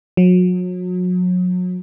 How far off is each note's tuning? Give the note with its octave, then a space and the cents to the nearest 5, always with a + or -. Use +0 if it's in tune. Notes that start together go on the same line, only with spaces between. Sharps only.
F#3 -35